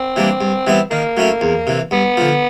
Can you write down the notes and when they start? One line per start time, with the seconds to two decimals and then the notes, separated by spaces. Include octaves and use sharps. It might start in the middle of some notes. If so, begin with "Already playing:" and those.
Already playing: C4
0.16 E3 G3 A#3 D4
0.41 G2
0.67 E3 G3 B3 E4
0.91 D#3 A#3
1.17 F#3 A3 C#4 E4
1.41 E2
1.67 C3 E3
1.91 G2 B3
2.17 D3 F3